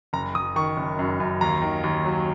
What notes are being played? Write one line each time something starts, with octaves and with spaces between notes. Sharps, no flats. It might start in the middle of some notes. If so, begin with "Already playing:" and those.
F#1 A#5
F#1 D#6
D#3 C#6
F#1
F#2
F#2
D#2 A#5
D#3
D#2
F#3